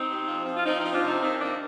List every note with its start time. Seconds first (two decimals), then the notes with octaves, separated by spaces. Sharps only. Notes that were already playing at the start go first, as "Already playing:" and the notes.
Already playing: C4 D#4
0.09 C3
0.27 F3
0.46 F3
0.56 F4
0.65 F3 C4 D#4
0.79 F3 C4 D#4
0.93 D4 F4
1.03 C3
1.08 C4 D#4
1.22 D#3 C4 D#4
1.41 D#3 A#3 D4